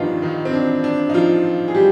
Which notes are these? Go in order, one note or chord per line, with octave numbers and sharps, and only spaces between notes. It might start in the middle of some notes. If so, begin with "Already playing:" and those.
Already playing: G2 D#3 F3 B3 D4 D#4 F4
D#3 D#4
C4
D4
D4
D#4
F3 F4
G#4
G3 G4